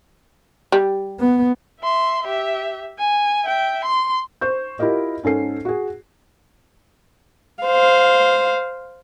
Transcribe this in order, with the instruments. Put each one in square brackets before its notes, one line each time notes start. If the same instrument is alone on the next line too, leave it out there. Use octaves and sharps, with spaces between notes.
[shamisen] G3
[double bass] B3
[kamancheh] E5 C6
G4 E5
G#5
E5 G5
C6
[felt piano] C5 C#6 G6
E4 F4 G4 A#4 D#5
G#2 C#4 A4 C7
F#4 G#4
[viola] C5 F5